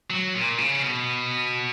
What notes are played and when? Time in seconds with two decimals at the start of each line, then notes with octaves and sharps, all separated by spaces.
0.10 F#3
0.34 A#2
0.58 C#3
0.83 B2